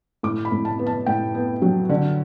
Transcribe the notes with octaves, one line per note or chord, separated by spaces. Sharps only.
A2 D6
B5
A2
A5
B3
A5
A2 G5
B3
F#3
D3